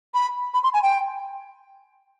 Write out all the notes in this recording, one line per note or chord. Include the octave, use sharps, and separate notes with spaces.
B5
B5
C6
G#5
G5